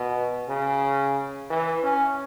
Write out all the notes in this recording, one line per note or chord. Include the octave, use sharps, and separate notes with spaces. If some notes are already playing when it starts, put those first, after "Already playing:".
Already playing: B2
C#3
E3
C#4